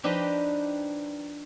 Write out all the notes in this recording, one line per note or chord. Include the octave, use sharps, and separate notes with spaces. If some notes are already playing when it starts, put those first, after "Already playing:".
F3 D4 D#4 G4 B4 D#5